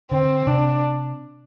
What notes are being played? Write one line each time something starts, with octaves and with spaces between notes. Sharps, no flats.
D3 C4
C3 D4